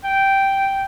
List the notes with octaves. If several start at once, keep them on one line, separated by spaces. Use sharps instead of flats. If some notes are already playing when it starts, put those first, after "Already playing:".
G5